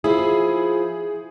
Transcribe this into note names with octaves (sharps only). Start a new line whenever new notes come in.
F3 E4 G#4